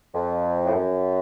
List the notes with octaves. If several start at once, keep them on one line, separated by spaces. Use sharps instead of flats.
F2
A2
F#2